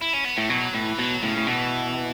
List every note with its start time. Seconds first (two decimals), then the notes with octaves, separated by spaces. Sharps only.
0.01 E4
0.13 C#4
0.25 B3
0.38 A2 A3
0.50 B2 F#3
0.75 A2 E3
0.99 B2 F#3
1.22 A2 C#3
1.37 A2
1.47 B2 E3